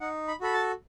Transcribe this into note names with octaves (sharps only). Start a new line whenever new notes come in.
D#4 F#5
B5
F#4 A4 B5
A5